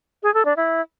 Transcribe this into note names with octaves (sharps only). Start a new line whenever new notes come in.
G#4
A4
D4
E4